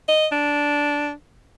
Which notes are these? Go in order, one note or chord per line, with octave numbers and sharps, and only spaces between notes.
D#5
D4